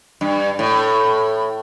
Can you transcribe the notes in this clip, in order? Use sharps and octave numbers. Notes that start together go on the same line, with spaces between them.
G2
A2